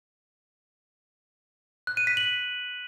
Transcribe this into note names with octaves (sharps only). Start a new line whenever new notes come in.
F#6
D#7
B6
F#7